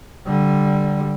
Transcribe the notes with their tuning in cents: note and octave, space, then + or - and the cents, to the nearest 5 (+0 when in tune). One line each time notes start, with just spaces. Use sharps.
D3 +0 G3 +0